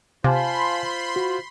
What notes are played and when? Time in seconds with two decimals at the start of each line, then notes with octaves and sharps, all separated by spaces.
0.24 C3 F4 C5 F5 G#5 A5 B5 C6
1.16 F#4